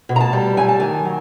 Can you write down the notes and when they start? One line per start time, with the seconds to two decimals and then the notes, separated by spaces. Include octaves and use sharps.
0.09 B2
0.16 A#5
0.20 A5
0.33 G3
0.57 F#3 G#5
0.68 A5
0.80 D#3 G#5
1.05 F#3